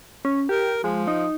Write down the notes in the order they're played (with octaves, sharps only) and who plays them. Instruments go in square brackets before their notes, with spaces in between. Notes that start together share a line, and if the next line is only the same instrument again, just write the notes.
[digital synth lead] C#4
[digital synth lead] G4 [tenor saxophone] A#4
[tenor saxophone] F3 [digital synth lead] G#3
[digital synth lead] D#4